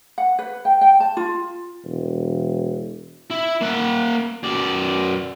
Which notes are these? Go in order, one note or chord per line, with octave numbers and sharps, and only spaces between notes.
F#5
B4
G5
G5
A5
F4
E1
E4
A#3 F#5
F#2 D5